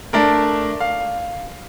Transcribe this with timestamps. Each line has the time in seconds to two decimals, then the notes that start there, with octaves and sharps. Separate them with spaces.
0.13 A3 D4 A#4
0.80 F5